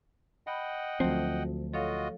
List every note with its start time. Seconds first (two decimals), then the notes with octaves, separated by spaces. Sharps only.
0.47 D#5 F#5 G5 B5
1.00 D2 F3 F#3 A3 C4
1.74 F4 F#4 A4 C#5 D#5 F5